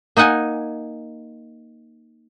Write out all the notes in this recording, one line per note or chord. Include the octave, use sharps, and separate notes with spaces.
A#3 D#4 D#5 F#5 G#5